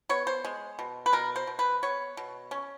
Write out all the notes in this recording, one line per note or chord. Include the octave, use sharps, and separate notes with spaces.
B3 C#5
C5
G#3
B2
B4
B2 A#4
C5
B2
B4
B3 C#5
B2
C#4